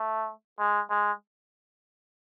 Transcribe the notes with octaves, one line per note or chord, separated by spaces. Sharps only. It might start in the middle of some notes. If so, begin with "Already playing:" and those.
Already playing: A3
G#3
G#3